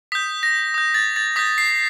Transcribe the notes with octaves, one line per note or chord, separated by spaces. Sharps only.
D#6 G6 B6
A#6
D#6 G6
A6
A6
D#6 G6 B6
C7